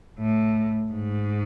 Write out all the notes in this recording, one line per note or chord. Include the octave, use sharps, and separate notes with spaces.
A2
G#2